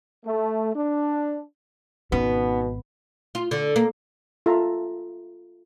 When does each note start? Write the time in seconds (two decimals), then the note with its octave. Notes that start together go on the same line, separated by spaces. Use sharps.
0.24 A3
0.74 D4
2.12 G#1 B2 B3 C#4 D#4
3.35 F4
3.51 D3
3.76 A#3
4.46 F4 A4 E5 A5 A#5